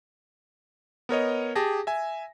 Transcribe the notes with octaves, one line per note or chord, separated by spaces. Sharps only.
B3 A#4 C#5 D#5
G4 G#4 A5 A#6
E5 G#5